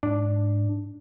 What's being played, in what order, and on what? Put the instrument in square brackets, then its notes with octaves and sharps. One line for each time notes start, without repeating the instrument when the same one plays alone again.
[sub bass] G#2 [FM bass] D4